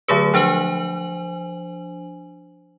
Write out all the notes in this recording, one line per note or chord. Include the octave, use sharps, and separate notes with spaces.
D3 F#3 A3 G#4 B4
F3 D4 C5 G#5 F#7